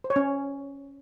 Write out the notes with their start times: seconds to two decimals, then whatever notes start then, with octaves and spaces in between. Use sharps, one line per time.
0.04 C5
0.10 C#5
0.16 C#4